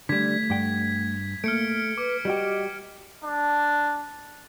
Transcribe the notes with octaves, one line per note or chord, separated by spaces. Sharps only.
D3 G3 A3 G#6 B6
G2 F#5 G5
A3 A#3 F6 C#7 D7
B4 D6
G3 F#4 G4 D#5
D4